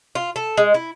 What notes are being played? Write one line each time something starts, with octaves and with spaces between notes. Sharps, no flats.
F4
A4
G#3
E4